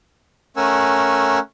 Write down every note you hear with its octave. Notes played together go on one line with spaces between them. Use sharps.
A3 C#4 A#4 F#5 G#5 E6